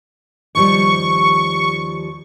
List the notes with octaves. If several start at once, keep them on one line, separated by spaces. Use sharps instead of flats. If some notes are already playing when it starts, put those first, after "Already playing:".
D#2 F3 G3 C#6